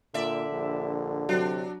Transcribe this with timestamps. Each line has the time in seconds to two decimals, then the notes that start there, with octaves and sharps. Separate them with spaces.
0.14 A#2 D3 D5 E5
0.51 A#1
1.29 C3 F#3 D4